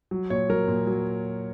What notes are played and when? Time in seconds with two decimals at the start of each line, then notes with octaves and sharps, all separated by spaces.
0.11 F#3
0.30 A#2 C#5
0.49 F#3 A#4
0.68 A#2
0.87 F#3